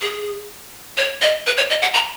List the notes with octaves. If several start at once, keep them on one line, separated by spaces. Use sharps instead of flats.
G#4
C#5
D#5
B4
C#5
D#5
F#5
A#5